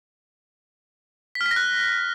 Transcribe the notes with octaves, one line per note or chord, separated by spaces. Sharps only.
B6
F6
B6
A#6
F#6